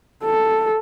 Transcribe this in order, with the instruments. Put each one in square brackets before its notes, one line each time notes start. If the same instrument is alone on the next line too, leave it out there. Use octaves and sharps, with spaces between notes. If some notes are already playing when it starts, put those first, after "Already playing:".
[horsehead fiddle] A4